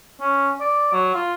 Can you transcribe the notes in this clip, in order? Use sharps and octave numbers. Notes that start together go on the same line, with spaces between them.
C#4
D5
F#3
F4